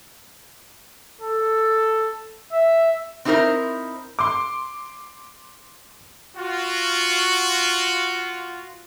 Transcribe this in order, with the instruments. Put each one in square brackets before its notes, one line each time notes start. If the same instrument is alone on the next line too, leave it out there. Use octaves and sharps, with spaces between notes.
[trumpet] A4
E5
[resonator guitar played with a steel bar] C4 D#4 E4 G#4 A#4 C5
[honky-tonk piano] C6 D6
[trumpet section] F4 F#4